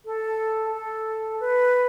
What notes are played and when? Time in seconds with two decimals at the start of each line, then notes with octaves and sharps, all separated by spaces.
0.06 A4
0.73 A4
1.40 B4